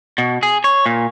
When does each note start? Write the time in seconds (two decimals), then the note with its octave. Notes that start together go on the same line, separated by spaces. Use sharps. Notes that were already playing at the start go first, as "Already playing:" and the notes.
0.18 B2
0.43 G#4
0.64 C#5
0.86 A#2